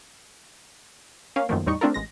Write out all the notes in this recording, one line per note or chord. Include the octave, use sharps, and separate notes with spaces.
A#3 C#4 F5
F#2 D#3 F3 F#3 A3 A#3
E2 A2 G3 D#4 C#6
A3 C4 D4 F4 A4 A#4
A1 G#3 A#6